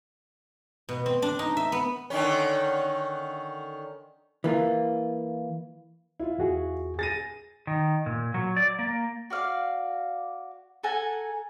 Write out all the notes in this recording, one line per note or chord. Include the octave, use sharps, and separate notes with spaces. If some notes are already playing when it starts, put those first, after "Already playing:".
B2
C4
D4
D#4
E5
B3
D3 D#3 C#4
E3 A#3 F4
E4 F4
E2 F#4 G#4
G#4 A6 A#6 D#7
D#3
A#2
F#3
D5
A#3
F#4 D5 F5
A4 F#5 G#5 A#5